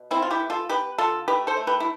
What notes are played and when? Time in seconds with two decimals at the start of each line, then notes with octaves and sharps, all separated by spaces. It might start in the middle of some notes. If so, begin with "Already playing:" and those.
Already playing: B2
0.11 D3 C4 E4
0.22 F4
0.30 E4 G4
0.40 B3
0.50 F4 A4
0.69 B3 G4 B4
0.98 D3 F4 A4
1.28 A3 G4 B4
1.47 A4 C5
1.57 A3
1.67 G4 B4
1.80 E4